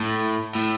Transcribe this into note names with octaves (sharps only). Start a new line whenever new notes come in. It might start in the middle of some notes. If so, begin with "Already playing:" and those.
Already playing: A2
A2